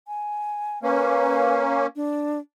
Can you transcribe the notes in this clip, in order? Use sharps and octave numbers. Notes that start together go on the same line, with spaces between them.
G#5
A#3 C#4 B4
D4